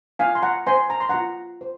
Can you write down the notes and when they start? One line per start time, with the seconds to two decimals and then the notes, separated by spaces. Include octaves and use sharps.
0.19 F4 F5 G#5
0.35 C6
0.42 F#5 A#5
0.66 C5 G#5 C6
0.90 A#5
1.00 C6
1.09 F4 F#5 A#5
1.61 C5